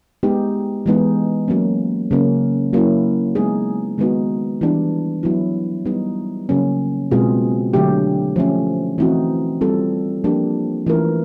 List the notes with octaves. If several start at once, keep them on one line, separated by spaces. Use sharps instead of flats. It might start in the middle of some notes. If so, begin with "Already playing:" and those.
G#3 B3 D#4 G4
E3 G#3 B3 D#4
F#3 A#3 C#4
C#3 F#3 A#3 C#4
F#3 A#3 C#4 E4
G#3 B3 D#4 G#4
D#3 G#3 B3 D#4 F#4
E3 G3 B3 D4 G4
F#3 B3 E4
G3 B3 D#4
C#3 F#3 A#3 C#4
B2 G#3 C4 F4 G#4
D3 F#3 A3 D4 G4
F3 A3 C#4
E3 A3 C4 D#4 F#4
G3 C4 F4 A4
F3 A#3 D4 G4
E3 A3 C#4 F4 A#4